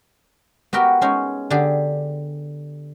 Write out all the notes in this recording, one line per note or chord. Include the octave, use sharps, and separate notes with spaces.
B3 F#4 G4 A#4 G5
G#3 C#4 D#4
D3 D4 G4 G#4